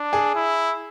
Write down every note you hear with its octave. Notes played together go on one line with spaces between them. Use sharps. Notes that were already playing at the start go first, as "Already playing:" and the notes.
Already playing: D4
G#4
E4